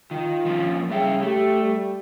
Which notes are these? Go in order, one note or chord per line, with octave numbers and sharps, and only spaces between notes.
D#3 F4
F3 A#3 C#4
C#3 G3 E5 G5
A3 G4
G3